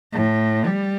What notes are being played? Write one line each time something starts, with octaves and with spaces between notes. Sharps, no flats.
A2
G3